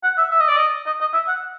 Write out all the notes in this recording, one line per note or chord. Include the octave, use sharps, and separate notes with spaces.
F#5
E5
E5
D#5
D5
D#5
D#5
D#5
E5
F#5